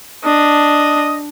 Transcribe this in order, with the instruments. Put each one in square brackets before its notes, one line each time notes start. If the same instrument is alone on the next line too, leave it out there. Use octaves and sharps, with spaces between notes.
[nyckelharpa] D4 [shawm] D#5